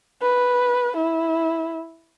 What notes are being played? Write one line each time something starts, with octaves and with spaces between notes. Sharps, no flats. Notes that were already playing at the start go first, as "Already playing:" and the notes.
B4
E4